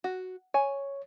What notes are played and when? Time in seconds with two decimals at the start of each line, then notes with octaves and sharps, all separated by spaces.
0.04 F#4
0.54 C#5 G#5